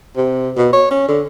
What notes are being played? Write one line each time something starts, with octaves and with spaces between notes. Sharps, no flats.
C3
B2
C#5
C#4
D3